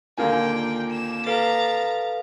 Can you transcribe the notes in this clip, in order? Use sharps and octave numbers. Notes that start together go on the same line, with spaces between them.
D#2 A#2 D3 A#3 F4 G5 G#5
E7
A4 B4 F5 A#5 A6